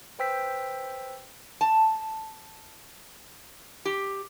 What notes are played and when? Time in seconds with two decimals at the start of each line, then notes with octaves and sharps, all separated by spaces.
0.19 B4 C5 G5 E6 B6
1.61 A5
3.85 G4